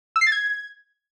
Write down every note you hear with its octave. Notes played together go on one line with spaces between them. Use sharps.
E6
C7
A6
G#6